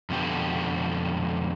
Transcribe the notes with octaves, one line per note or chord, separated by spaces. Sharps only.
F2 B2 D3 G4